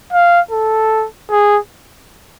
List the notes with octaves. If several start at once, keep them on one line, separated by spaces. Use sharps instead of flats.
F5
A4
G#4